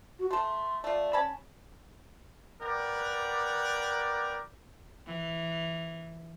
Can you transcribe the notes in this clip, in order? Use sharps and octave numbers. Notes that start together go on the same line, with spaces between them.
F#4
A3 A4 C6
A3 F4 D5
C#4 A5 B5
A#4 B4 D5 F#5 G5
E3